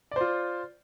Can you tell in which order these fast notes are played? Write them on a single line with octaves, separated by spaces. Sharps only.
D5 C5 F4